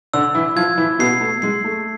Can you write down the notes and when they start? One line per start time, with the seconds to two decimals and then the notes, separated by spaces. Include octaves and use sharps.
0.13 D3 D4 E6
0.35 E3 E4
0.56 F3 F4 G#6
0.78 E3 E4
0.99 B2 B3 C7
1.21 A3
1.42 G#3 C7
1.64 A3